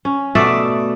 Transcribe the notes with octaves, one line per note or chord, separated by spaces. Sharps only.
C#4
B2 A3 D5 E5